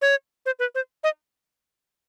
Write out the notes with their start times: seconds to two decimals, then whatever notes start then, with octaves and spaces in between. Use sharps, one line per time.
0.02 C#5
0.46 C5
0.59 B4
0.75 C5
1.04 D#5